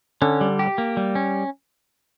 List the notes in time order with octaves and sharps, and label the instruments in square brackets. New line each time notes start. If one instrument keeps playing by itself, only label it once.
[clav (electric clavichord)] D3 [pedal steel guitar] C#4
[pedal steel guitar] G3
G4
A#3
G3
C#4